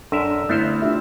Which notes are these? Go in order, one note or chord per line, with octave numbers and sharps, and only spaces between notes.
F#2 D4 A4 A#4 E5
G1 A3 B3 C4 E4 C5 F6
D4 F4 G4 E5